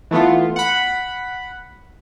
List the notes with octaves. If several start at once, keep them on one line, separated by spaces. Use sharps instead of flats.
E3 A3 B3 F4
F#5 B5